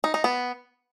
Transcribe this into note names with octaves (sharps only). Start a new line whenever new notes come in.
D#4
D#4
B3